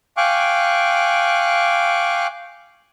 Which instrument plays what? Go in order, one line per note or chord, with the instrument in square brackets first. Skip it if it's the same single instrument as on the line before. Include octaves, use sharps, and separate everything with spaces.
[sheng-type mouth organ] F5 G5 G#5 C#6 D6 F#6